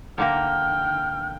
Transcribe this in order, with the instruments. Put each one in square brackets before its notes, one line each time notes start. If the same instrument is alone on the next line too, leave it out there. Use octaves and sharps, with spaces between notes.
[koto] D3 A#3 A#4 [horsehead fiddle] G5 [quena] F6